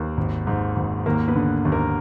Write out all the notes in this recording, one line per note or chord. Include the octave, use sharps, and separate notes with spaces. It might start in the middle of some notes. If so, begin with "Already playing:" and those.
Already playing: D#2 A#3
G#1
G#2
G#1
D#2 A#3 A#4
B3 B4
D3
D#2
A#3 A#4